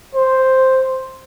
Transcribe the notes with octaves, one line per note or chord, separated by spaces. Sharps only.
C5